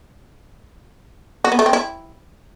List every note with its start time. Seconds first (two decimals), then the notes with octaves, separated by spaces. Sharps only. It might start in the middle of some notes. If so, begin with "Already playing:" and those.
1.44 F#4
1.52 B3
1.59 A3
1.66 C4
1.73 E4